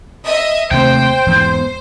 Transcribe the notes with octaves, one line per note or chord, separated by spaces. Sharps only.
D#5 E5 D#6
D#2 C3 A3 C5 G5
E2 G#2 B3